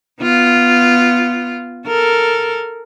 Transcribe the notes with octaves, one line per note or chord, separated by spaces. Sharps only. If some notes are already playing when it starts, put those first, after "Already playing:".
B3 F4
A4 A#4